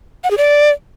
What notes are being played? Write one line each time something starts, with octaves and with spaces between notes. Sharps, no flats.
F#5
G#4
D5